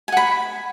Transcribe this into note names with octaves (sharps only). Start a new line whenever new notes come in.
F#5 G#5 B5